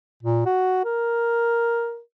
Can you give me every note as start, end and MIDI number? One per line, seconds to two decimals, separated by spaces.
0.23 0.41 46
0.46 0.85 66
0.85 1.99 70